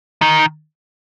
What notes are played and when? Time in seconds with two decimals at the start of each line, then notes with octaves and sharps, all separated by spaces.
0.22 D#3